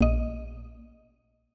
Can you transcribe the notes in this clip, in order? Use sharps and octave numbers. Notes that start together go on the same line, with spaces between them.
A#1 D#5